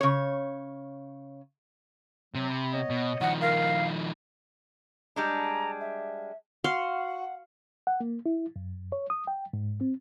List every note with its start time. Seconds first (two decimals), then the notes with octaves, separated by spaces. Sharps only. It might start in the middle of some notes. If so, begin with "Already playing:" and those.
0.01 C#3 C#5
2.35 C3 F#3
2.50 B5
2.72 B3 C#5 D#5
2.90 B2
3.21 D#3 F3 F#5
3.41 A#4 F5
5.16 G3 G#3 D4 A#5
5.80 E5
6.64 F#4 F5 F#5 C6
7.87 F#5
8.00 A#3
8.26 E4
8.56 F#2
8.92 C#5
9.10 D#6
9.27 G5
9.53 G#2
9.81 C4